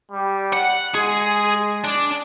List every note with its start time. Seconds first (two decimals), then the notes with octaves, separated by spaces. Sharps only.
0.12 G3
0.53 F#5
0.95 G#3 G#4
1.85 D4